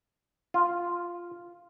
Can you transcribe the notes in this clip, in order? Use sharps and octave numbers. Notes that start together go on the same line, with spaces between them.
F4